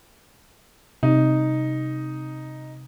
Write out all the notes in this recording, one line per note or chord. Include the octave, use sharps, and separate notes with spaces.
C3 D#4